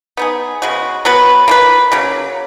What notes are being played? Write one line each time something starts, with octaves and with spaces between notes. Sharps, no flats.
B3 D#4 G#4
C#3 G#3 B3 F#4
F#3 B3 F#4 B4
A#3 F4 B4
C#3 F#3 A#3